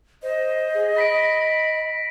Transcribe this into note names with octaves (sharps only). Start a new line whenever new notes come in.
C5 D#5
G#4
B5 A#6 B6 D7